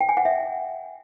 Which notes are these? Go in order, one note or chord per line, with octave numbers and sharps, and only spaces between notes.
G5
G#5
F#5
E5